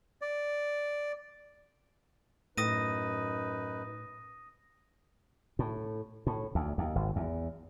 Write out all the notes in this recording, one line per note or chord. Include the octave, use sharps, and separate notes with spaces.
D5
F#2 A2 D#4 B4 D#6 A#6 D#7
A2
A2
D2
D#2
G#1
E2